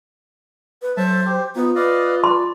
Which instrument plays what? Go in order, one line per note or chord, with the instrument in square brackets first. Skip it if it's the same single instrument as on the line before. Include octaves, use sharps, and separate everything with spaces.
[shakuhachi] B4
[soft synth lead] F#3 [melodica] A4 E5 A5 [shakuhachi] C5
[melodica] G4
[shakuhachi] B3 [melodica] D#4 [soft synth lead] F4
[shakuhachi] B4 [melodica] D5 D#5 F5
[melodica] D5 [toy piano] C6